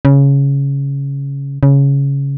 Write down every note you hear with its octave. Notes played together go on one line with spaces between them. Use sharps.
C#3
C#3